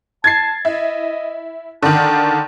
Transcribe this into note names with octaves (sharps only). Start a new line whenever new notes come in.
A5 G#6 A6 C7
E4 D#5
D3 D#3 A5